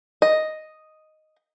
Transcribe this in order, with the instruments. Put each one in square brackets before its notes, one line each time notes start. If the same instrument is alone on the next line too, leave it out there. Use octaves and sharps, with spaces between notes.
[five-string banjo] D#5